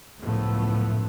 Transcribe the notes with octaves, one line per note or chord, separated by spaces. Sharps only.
C#2 F#2 A2 F3 A3 B3